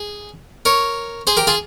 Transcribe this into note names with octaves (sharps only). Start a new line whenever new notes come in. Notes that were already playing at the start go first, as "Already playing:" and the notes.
Already playing: G#4
A#4 C#5
G#4 C5
G4 A#4
F4 G#4